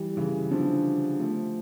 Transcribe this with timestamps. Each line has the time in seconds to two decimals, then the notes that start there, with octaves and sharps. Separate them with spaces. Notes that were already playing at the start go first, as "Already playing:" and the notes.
Already playing: E3 G3
0.17 C#3 E3
0.51 D3 F3
1.19 F3 A3